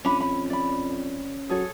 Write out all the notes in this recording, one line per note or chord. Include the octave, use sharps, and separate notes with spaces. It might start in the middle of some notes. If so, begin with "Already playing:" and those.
F2 C#4 D4 B5
B5
D5 B5
F#3 G#4 A4 C#5